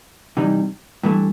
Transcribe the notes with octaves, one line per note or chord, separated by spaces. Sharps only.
C3 E3 G3 D#4
G2 E3 A3